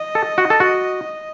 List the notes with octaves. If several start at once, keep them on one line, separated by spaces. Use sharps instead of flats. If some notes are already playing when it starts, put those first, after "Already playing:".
Already playing: D#5
A4
F#4
A4
F#4